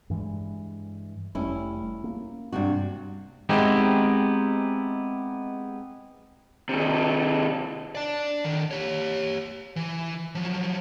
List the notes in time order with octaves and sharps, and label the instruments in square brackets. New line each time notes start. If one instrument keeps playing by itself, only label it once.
[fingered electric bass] G2 E3 G#3
[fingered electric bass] F1 G3 A3 [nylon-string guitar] C#4 E4
[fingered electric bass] A#3
[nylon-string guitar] G2 C3 F#4
[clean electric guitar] G#3 B3 C4 D#4 E4 G4
[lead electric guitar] C3 D#3
D5 A5
D3 D#3
G4 C#5
E3
F3 F#3